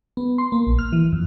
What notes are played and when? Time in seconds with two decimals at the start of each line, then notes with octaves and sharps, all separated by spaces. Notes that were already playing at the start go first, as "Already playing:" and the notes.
0.17 B3
0.38 C6
0.52 A#3
0.67 A#1
0.79 F6
0.92 E3
1.12 F2